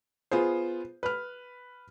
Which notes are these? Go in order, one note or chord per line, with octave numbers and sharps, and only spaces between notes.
B3 F4 G#4 C5
B4 F6